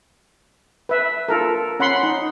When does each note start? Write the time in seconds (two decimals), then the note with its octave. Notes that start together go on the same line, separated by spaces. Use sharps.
0.89 B4 E5
1.28 F4 A4 A#4
1.80 C#4 F#5 B5 C6
2.03 D#4